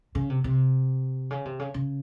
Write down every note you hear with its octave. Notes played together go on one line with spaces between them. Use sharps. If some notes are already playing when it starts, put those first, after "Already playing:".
C#3
C3
C3
C#3
C3
C#3
C#3